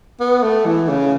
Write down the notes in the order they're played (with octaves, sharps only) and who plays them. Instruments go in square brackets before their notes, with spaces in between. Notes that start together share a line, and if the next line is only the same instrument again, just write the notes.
[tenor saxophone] B3
A3
E3
C#3